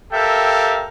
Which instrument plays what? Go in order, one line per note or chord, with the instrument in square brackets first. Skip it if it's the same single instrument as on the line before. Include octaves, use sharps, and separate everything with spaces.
[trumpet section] G4 A4 A#4 E5 F5 G5